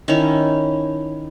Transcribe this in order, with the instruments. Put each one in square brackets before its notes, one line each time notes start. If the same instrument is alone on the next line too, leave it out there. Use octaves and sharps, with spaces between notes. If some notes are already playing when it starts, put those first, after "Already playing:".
[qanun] D#3 C#4 E4 C#5